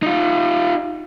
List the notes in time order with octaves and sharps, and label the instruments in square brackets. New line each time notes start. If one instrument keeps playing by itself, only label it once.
[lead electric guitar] D#4 F4